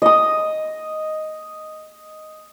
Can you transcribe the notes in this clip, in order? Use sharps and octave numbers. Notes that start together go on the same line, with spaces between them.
D#5 D#6